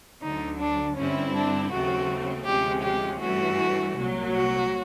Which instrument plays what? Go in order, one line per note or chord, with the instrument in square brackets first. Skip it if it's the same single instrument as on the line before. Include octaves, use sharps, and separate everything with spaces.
[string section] D2 D3 F#3 [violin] D#4
[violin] D4
[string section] G2 D3 G3 C4 E4 [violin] C#4
[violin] D4
[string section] D#2 C#3 F#3 A3 C4 [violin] F#4
[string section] D2 C3 F3 G#3 C#4 [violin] G4
[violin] G4
[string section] G2 E3 A3 C#4 [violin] F#4
[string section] C2 A#2 F#3
[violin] F#4